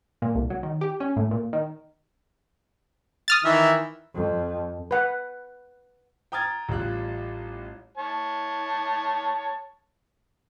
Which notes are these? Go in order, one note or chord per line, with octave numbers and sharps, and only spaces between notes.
A#2
C2
F#3
D#3
G4
C#4
A2
A#2
D#3
D#6 F6 A6
D#3 E3 E5
F2
B4 F#5
G5 A#5 D#6 F6 G#6 A6
A1 G3 F4 F#6
C#5 A5